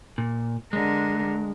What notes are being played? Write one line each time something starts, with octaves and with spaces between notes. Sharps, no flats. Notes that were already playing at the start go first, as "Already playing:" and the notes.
A#2
D3 G#3 A#4